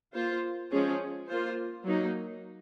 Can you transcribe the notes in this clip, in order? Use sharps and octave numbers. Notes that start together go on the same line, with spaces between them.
A#3 F4 C5
F3 G#3 C#4 G#4
A#3 F4 C5
F#3 A#3 D#4